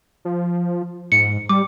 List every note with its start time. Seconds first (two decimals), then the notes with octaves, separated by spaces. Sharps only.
0.25 F3
1.12 G#2 C#7
1.49 G3 D6